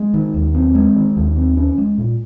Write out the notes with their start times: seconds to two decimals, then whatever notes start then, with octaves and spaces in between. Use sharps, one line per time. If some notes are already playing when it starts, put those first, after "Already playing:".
Already playing: G#3
0.14 D#3
0.34 D#2
0.55 C4
0.75 G#3
0.96 D#3
1.17 D#2
1.37 C4
1.57 C#4
1.78 G#3
1.98 A#2